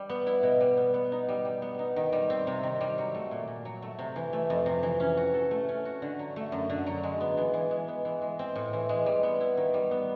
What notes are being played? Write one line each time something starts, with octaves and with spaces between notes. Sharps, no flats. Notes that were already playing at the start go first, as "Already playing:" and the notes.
Already playing: G3
B3
E4
B2
G3
B3
B3
D#4
G3
G3
B3
D#4
D#3
G3
C4
C3
D#3
G3
F#3
A3
A#2
A#2
F#3
A3
C3
E3
A3
F2
C3
E3
C#4
F#4
A4
A3
C#4
F#4
D3
F#3
A3
F#2
D3
F#3
G#3
B3
E3
E3
G#3
B3
E3
G#3
C4
A2
E3
G#3
G3
B3
E4
D#3
G3
B3